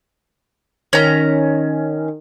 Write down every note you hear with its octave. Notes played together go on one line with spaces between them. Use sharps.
D#3 C#4 A#5